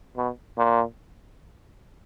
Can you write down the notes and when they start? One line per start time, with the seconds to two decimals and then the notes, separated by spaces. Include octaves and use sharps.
0.17 B2
0.58 A#2